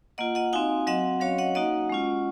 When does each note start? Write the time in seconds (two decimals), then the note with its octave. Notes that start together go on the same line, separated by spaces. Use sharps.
0.18 A#3 F4 D#5 F#5
0.35 D#5 F#5
0.53 C4 D#4 F#4 F5 G#5
0.87 F#3 C4 F#4 D#5 F#5
1.21 F#3 C#4 F#4 C#5 F5
1.38 D#5 F#5
1.55 A#3 D#4 F#4 D#5 F#5
1.90 G#3 C#4 F4